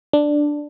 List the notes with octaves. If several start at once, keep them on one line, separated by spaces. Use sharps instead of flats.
D4